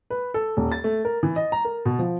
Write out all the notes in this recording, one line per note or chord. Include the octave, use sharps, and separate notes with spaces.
B4
A4
D#1
A6
A3
A#4
E3
D#5
A#5
A#4
B2
F3